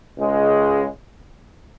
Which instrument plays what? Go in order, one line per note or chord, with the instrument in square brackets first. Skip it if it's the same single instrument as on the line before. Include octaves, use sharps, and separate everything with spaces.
[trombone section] C#2 C#3 G#3